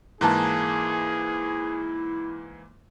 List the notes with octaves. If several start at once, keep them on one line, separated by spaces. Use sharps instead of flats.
G#2 E3 A#3 E4 G#4 A5 A#5 F#6